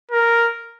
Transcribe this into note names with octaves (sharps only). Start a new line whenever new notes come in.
A#4